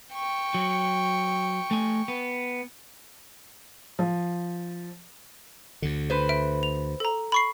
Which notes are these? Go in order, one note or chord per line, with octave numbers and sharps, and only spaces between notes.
G5 C#6
F#3
A3 G#5
B3
F3
D2 D3
B4 C5
E5 D7
F7
A4 A#5
B5 C#6 C7